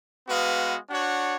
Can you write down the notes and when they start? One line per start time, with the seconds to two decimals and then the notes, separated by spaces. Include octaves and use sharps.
0.27 G#3 B3 F#4 B4 F5
0.90 D4 F#4 C#5 F#5